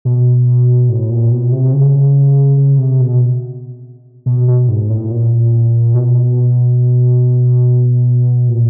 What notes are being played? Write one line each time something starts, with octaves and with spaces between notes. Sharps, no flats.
B2
A2
A#2
B2
C3
C#3
C#3
C3
B2
B2
B2
G#2
A2
A#2
B2
A#2